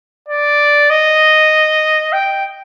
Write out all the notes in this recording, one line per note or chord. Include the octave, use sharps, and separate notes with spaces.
D5
D#5
G5